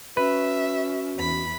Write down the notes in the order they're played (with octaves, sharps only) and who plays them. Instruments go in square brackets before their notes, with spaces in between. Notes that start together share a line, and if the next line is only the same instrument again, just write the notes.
[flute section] C#4 F#4 [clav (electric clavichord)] B4 [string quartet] E5
[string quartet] E2 B5